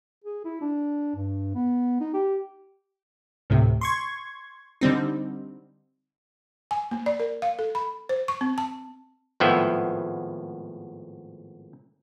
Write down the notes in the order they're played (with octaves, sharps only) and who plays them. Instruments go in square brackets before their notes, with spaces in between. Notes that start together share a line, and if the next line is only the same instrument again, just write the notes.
[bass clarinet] G#4
E4
D4
G2
B3
D#4
G4
[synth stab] D2 A2 C3
C6 C#6 G#6
D3 G3 C4 D#4
[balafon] G#5
A#3
D5
A#4
F5
A4
B5
C5
C#6
C4
A5
[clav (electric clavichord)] G#1 A2 F3 B3 E5 G5